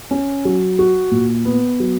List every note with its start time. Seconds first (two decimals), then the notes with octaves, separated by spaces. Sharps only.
0.11 C#4
0.45 F#3
0.79 F#4
1.11 A#2
1.45 B3
1.80 F#3